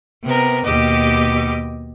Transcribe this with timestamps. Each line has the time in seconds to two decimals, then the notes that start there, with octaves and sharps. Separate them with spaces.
0.24 C3 B3 A#4
0.65 D#2 B2 G4 D#5 D6